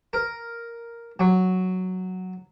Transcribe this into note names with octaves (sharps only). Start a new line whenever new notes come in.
A#4
F#3